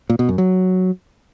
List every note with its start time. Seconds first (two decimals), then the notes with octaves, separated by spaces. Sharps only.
0.10 A#2
0.19 B2
0.29 F#2
0.38 F#3